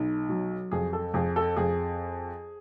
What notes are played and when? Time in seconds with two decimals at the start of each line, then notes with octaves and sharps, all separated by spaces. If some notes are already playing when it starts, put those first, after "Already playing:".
Already playing: B1
0.29 F#3
0.71 F2 G#4
0.93 A4
1.14 F2 G#4
1.36 A4
1.57 F2 G#4